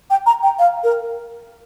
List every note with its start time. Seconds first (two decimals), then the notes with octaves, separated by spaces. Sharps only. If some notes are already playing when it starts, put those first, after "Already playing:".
0.10 G5
0.26 A#5
0.43 G5
0.59 F5
0.84 A#4